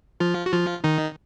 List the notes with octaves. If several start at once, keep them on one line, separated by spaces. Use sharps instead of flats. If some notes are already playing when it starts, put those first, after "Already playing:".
F3 F4
F#4
F3 F4
D#3 D#4